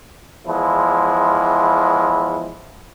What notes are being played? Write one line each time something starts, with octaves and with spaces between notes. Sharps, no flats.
E2 F3 G#3 E4